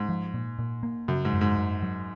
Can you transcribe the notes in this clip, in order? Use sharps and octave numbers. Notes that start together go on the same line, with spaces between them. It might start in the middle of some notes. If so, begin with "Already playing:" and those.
Already playing: G#2 C#4
F3
A#2
A#2
A#3
F#2 C#3
G#2
F#2
G#2
F#2
F#3